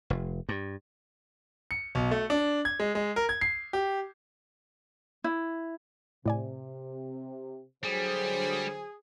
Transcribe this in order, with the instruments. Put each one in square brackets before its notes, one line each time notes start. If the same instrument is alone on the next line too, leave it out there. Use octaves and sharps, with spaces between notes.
[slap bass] F1
G2
[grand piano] C#7
B1
A3
D4
G#6
G#3
G#3
A#4
G#6
C7
G4
[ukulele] E4
[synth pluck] A2 D5 G#5 [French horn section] C3
[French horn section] D3 F#3 C5 [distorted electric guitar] G3 [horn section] G#4